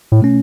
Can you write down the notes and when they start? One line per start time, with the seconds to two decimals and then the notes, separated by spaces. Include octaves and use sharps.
0.12 A2
0.20 B2 A3 C#4